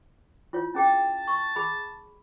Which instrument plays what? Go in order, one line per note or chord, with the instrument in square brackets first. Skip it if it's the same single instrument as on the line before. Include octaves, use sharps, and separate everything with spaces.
[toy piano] E4 F4 C#5
[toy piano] C#4 G#4 G5 [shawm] A5
[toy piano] C#6
G#4 B5